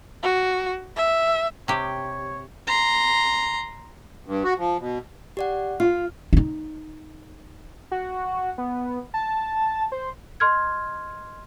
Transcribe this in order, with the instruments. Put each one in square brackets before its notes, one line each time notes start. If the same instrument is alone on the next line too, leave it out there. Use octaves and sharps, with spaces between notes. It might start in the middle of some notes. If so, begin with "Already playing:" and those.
[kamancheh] F#4
E5
[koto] C3 G4 [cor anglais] C#5
[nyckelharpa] A#5 C6
[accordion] G2
F#4
F3
B2
[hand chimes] G4 D5 F#5
[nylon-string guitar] F4 [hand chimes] F6
[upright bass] D#4 E4
[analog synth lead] F#4
B3
A5
C5
[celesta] D#5 C6 F6 G#6